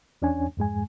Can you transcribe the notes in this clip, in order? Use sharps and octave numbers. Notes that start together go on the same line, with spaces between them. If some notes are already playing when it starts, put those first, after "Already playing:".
E2 C#4 D4 C#5 G#5
F2 G#2 G#3 G#5